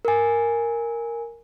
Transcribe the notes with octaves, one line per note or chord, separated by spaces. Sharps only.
A#4 G#5